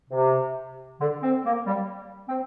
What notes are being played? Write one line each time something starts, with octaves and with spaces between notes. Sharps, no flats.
C3
D3
C4
A#3
G3
C4